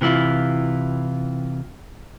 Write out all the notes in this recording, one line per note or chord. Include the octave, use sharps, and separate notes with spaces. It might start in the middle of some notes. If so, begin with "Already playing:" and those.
C3 E3 A3 E4 F4